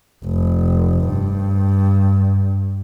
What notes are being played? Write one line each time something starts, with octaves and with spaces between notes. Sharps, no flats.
F1
G2